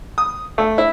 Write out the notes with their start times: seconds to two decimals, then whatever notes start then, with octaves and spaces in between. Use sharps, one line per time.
0.18 D#6
0.58 A3
0.78 E4